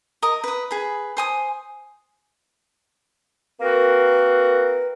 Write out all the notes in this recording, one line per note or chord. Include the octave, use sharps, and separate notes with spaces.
A#4 D#5 D#6
B4 D#6
G#4 B4 B5
C5 G#5 D#6
A#3 C4 F#4 A#4 B4